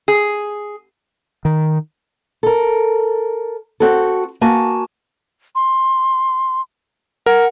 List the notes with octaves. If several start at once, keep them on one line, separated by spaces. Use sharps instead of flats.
G#4
D#3
A4 A#4
C4 F#4 A4
A#3 F#4 G#5 A5
C6
A#4 F#5